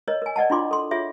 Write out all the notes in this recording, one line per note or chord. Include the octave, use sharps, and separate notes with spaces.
A#4 C#5 D#5
A#4 G#5
D5 D#5 F#5 A5
D4 E4 F4 C6 D6
A4 C6
F4 G#4 C#5 E5